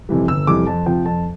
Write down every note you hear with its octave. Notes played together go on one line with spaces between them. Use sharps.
F2 C3 E3 G3
G1 E6
F2 C3 E3 G3 D6
F2 A5
C3 F3 G5
F2 A5